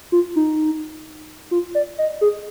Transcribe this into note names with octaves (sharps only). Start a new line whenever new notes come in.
F4
D#4
F4
D5
D#5
G#4